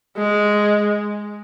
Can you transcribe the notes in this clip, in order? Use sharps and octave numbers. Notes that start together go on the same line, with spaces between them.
G#3